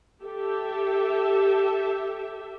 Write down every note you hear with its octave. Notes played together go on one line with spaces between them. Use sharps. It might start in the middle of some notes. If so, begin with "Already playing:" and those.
G4 A4 E5